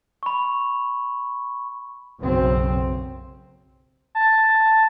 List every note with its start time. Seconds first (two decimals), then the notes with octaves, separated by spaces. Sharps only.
0.23 B5 C#6
2.20 B1 F#2 C#3 C4
4.15 A5